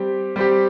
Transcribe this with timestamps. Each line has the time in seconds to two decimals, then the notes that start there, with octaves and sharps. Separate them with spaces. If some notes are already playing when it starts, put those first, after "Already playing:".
Already playing: G3 C4 G4
0.36 G3 C4 G4